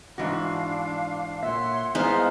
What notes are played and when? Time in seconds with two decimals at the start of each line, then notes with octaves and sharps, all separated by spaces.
0.18 G#2 E3 D4 F#4 F5
1.43 A#2 C#5 E5 F#5 C6
1.95 G#3 B3 D#4 E4 C5 F5 F6